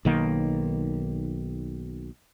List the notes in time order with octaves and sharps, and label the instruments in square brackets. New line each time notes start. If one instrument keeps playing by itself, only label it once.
[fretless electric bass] B1 D#3 A#3